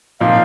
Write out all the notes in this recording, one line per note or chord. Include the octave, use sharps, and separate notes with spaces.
A#2 F3 C4 D#4 F5